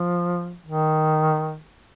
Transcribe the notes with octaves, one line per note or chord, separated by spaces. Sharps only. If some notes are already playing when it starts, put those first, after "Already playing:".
Already playing: F3
D#3